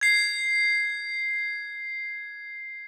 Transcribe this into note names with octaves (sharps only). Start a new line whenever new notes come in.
G#6 C7